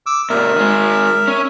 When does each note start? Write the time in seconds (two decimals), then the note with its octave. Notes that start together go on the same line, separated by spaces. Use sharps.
0.06 D6 E6
0.30 A#2 C#3 A#4 E5
0.56 D#3 G#3
1.28 C#4